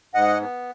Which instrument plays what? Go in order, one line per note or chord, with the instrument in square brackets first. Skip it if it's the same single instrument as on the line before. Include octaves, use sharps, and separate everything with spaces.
[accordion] G#2 D#5 F#5
B3